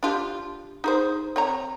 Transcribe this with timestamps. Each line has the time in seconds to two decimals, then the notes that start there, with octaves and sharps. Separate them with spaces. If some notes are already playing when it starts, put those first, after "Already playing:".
0.03 D4 F4 G4
0.84 D#4 G#4 C5
1.36 C4 C#5 A#5